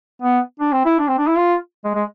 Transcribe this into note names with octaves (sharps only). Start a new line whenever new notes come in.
B3
D4
C4
E4
D4
C4
D4
E4
F4
G#3
G#3